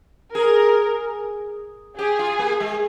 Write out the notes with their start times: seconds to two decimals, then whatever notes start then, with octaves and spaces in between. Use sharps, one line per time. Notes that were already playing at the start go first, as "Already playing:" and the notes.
0.34 G#4 A#4
1.99 G4 G#4
2.19 F4
2.39 A#3
2.60 G#3